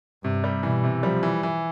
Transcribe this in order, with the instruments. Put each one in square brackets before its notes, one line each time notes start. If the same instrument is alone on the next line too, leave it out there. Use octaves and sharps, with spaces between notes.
[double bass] G2 [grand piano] C3
[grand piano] G3
[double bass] B2 [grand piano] E3
[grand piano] C3
[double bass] F3 [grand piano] G3
[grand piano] E3
E3